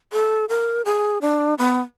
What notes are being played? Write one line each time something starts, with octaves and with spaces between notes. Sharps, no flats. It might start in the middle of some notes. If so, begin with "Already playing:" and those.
A4
A#4
G#4
D4
B3